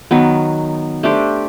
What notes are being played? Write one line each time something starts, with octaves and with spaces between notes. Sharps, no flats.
D#3 F#3 B3
A3 D4 G4 C5